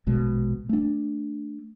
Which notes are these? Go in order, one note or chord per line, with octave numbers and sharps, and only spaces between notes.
A#1 B2 G#3
A3 D4